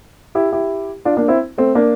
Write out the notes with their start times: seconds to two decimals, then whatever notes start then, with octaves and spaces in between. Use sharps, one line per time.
0.35 E4 G4
0.52 E4 G4
1.05 D4 F4
1.17 A#3 D4
1.28 C4 E4
1.58 A3 C4
1.75 A#3 D4